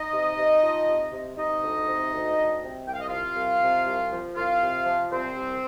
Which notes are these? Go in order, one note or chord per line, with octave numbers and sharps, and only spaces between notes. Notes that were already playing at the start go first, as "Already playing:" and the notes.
Already playing: D#4 D#5
C3
C3
F3
C3
C3
C3 D#4 D#5
D2
C3
D2
D2
C3
C2 G5
F5
D#5
C3 F4 F5
C2
C3
C2
F3
C2 F4 F5
C3
F3
C2 C4 C5
C2